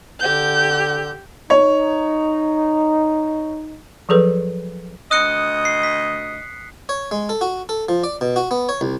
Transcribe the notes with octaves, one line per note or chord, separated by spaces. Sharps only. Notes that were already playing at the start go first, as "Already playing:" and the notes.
D3 G4 G6
D#4 C#5
F3 F#3 G#4 A4 B4
D2 D#5 D#6 F#6 C#7
C7
B6
C#5
G#3
A4
F#4
A4
F3
D5
B2
F#4
B3
C#5
C2